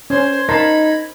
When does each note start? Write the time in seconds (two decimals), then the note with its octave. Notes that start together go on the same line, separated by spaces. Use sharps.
0.10 C#4 C5 G#6
0.49 D#4 A#4 A5 B5 C6